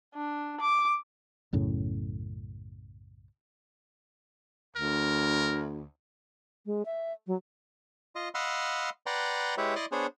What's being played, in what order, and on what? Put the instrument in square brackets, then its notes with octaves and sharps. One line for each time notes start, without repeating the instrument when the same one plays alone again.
[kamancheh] D4
D6
[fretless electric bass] B1 F#2 A2 C#3
[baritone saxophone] D2 [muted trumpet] A#4
[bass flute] G#3
E5
F#3
[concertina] F4 D#5
D#5 F5 F#5 B5 C6 E6
B4 D5 F#5 G5 A#5 C6
G#3 E4 G4 B4 C#5 E5
E4 D5 D#5 C6 D6
B3 D4 G#4 C5 C#5